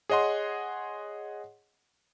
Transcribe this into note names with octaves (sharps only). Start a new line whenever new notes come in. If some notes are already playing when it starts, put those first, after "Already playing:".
G#4 C#5 D#5 F#5 C6